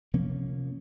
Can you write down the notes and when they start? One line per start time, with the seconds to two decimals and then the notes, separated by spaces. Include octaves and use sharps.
0.13 C3 F3 A#3 C#4